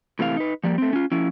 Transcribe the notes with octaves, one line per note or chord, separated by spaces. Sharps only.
A2 C3 E3 A3 F5
D#4 B4
F3 G3 A#3
A3 C4
C#4 F4
F3 C#4 E4